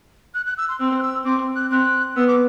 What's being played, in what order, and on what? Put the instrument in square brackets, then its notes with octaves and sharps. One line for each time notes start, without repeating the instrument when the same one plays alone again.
[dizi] F#6
F#6
E6
C6
[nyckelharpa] C4 [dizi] E6
[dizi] F#6
E6
[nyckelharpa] C4 [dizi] D6
[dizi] F#6
[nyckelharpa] C4 [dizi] F#6
[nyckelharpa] B3 [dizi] E6
[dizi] D6